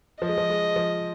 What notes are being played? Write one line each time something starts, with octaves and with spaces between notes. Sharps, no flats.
F3 D#5
G#3
F3
G#3
F3